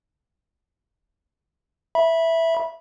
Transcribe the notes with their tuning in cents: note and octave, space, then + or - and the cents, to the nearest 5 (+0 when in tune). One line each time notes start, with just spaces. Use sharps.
E5 +0 B5 -25